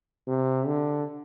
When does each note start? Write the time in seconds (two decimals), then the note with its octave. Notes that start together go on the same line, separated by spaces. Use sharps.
0.28 C3
0.66 D3